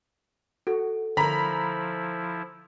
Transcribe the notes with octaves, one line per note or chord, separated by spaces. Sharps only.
F#4 A4
D3 F3 E4 A#4 A#5 B5 B6